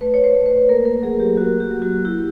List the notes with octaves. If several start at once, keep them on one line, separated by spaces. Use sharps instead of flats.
A3 B4
C#5
C5
A3
B4
A#3 A#4
A#4
F#3 G#4
G4
F#3 F#4
G4
F#3
F#4
E4 G4